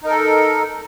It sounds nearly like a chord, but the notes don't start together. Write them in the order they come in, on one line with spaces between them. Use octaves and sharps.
D#4 A#4 A4